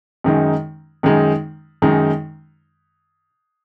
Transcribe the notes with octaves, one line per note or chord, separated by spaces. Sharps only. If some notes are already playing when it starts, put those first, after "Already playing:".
F#2 D#3 G#3 D#4
F#2 D#3 G#3 D#4
F#2 D#3 G#3 D#4